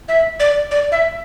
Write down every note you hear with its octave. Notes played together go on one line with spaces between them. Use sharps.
E5
D5
D5
E5